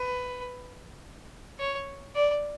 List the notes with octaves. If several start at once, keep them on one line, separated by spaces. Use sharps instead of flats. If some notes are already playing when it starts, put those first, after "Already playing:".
Already playing: B4
C#5
D5